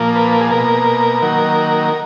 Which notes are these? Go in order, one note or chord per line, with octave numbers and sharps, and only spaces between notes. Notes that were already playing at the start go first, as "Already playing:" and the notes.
Already playing: A#2 F3 A#3
B4
G#4
B2 A#3 A#4
D#3 F#3 A#3